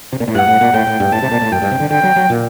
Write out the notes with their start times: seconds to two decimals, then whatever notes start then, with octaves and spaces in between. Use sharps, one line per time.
0.13 C3
0.20 A#2
0.28 A2
0.35 G2 F#5
0.48 A2
0.61 A#2
0.74 A2 G5
0.87 A2
1.00 G2
1.12 A2 A5
1.22 C3
1.31 A#2
1.42 A2
1.52 F#2 G5
1.62 G2
1.71 C3
1.80 D3
1.91 D3 G5
2.03 F#3
2.16 F#3
2.30 A#2